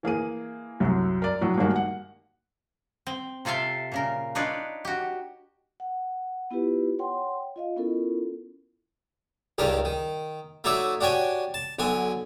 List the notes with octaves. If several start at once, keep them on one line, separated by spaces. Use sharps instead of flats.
E3 A#3 G#4 D#7
C2 F#2 F#3
A#4 D5
A2 F#3 D4
G2 D#3 G#3 A#3 F#4
F#5
C4
C3 F4 A4 E5 F5 G5
A#2 C#3 A#4
D4 D#4 F4 B4 C#5 D5
F#4 G4
F#5
B3 E4 F4 G4 B4
C#5 F#5 G5 C6
F4 D#5 F5
B3 C#4 E4 F4 A4 A#4
C#2 G2 D#3 D4 A#4
D#3
A3 D#4 F#4 C#5 D5 E5
D4 F#4 G4 C#5 G#5
A5
B1 D3 F#4 G#5